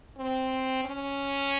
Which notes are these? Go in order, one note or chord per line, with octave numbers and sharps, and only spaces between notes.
C4
C#4